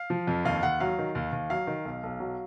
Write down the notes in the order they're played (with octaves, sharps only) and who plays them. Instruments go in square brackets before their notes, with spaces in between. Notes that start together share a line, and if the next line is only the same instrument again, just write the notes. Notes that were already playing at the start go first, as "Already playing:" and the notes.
Already playing: [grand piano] F5
F3
F2
D#2 F5
D#2 F#5
F#3 F5
D#3
D#2
D#2
F#3 F5
D#3
B1
B1
F#3